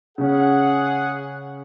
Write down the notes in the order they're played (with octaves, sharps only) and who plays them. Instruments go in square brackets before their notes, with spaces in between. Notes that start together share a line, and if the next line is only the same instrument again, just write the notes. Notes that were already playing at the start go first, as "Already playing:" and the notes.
[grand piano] C#3 C#4 [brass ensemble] G#4 F#5